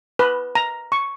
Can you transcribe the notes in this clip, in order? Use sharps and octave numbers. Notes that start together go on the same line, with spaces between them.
B4
A#5
C#6